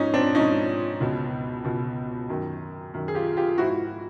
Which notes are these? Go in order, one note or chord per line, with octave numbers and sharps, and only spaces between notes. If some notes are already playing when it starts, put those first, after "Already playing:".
Already playing: G#2 F3 C#4 D#4
C4 D4
G#2 F3 C#4 D#4
C#2 B2
C#2 B2
F#2 D#3
F#2 D#3
G#4
F4 G4
F4 G4
G#2 F3 E4 F#4